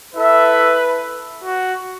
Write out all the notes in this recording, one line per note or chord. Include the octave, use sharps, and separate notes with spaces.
E4 A4 B4 E5
F#4